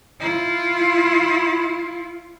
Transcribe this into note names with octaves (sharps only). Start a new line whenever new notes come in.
E4 F4